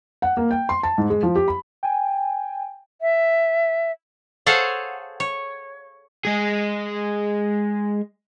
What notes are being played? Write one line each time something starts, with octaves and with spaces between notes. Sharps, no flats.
F#5
A#3
G5
C6
A5
G#2
G#3
F3
G4
B5
G5 G#5
E5
G#4 A4 C5 C#5 F5 F#5
C#5
G#3 G#4